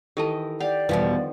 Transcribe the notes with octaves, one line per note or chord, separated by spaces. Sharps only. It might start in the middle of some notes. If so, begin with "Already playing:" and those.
D#3 E3 G4 A4 D#5 A5
G4 D5 F5 F#5
E2 B2 D3 D#3 F3 G3 B4 F5